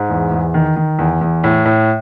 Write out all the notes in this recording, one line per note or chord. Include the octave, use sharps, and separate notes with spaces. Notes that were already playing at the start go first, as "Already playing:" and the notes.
Already playing: G#2
E2
E2
D#3
D#3
E2
E2
A2
A2